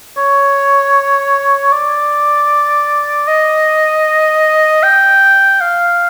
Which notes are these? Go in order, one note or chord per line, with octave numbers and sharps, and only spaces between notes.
C#5
D5
D#5
G5
F5